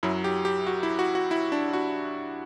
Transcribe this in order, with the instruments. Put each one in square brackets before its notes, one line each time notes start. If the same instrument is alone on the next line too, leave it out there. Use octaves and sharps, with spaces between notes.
[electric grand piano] F#2 F#3 E4
G4
G4
F#4
E4
F#4
F#4
E4
D4
F#4